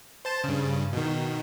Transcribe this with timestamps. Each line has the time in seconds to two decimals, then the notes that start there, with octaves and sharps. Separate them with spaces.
0.25 C5 A5
0.44 G2 C#3
0.93 B2 D#3